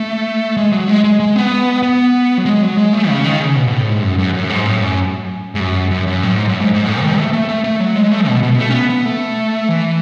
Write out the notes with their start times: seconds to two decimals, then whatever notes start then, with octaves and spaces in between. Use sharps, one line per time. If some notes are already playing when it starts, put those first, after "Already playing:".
Already playing: A3
0.57 G#3
0.72 F#3
0.88 G#3
1.04 G#3
1.20 G#3
1.36 B3
1.83 B3
2.38 F#3
2.46 G#3
2.62 F#3
2.77 G#3
2.93 A3
3.09 C#3
3.24 D#3
3.39 C#3
3.56 B2
3.68 B2
3.71 A2
3.87 G#2
4.02 F#2
4.18 F#2
4.34 F#2
4.50 G#2
4.65 A2
4.82 F#2
5.55 G#2
5.60 F#2
5.91 F#2
6.07 F#2
6.23 A2
6.36 G#2
6.48 F#2
6.61 G#2
6.74 G#2
6.86 A2
7.02 D#3
7.17 A3
7.33 A3
7.49 A3
7.64 A3
7.80 F#3
7.96 G#3
8.12 A3
8.27 B2
8.43 B2
8.59 A3
8.69 C#4
8.74 B3
8.90 B3
9.06 A3
9.69 E3